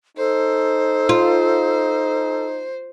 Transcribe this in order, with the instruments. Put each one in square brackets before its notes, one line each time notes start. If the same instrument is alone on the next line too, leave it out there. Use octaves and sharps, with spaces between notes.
[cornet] D#4 [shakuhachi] A4 [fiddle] C5
[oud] F4